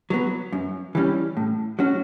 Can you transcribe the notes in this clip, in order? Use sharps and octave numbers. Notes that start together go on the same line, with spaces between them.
F#3 B3
F#2
E3 G3 C#4
A2
F#3 C#4 F#4